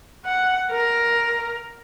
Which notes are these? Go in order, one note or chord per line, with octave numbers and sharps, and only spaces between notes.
F#5
A#4